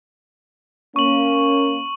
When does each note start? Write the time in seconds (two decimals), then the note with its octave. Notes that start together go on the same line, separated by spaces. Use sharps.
0.96 A#3 C#4 C#6 F#7